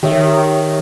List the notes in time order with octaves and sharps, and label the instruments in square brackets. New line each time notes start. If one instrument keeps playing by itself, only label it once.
[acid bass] D#3 [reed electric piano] G4 C#5 E5